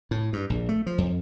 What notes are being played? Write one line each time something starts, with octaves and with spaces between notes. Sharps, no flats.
A2
G2
A#1
A3
F3
F2